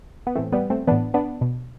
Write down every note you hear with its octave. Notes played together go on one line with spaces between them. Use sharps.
B3
A2 E3 A3 C4
G3 B3
A3 C4
A2 E3 B3 D4
B3 D4
B2